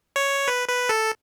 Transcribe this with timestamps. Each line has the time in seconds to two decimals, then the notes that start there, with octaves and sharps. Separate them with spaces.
0.16 C#5
0.48 B4
0.68 B4
0.89 A4